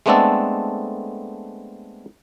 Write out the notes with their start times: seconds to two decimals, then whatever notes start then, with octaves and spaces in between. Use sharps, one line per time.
0.06 G#3 A3 B3 C4 D4 A4